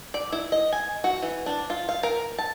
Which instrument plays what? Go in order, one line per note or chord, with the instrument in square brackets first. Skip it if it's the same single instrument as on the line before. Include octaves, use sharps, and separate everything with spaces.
[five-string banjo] D5
E4
D#5
G#5
F#4
E3
D4
F4
F5
A#4
A5